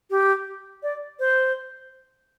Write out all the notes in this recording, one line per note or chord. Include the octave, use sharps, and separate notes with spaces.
G4
D5
C5